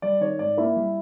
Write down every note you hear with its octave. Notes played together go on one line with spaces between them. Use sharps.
G3 D5
D#3 C#5
G#2 D5
A#3 E4 E5
G3